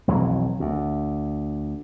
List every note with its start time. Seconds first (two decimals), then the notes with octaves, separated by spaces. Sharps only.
0.07 B1 F2 E3 F#3
0.60 D2